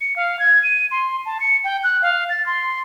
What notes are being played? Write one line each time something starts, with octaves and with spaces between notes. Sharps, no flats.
C#7
F5
G#6
D#7
C6
A5
C#7
G5
F#6
F5
A6
C6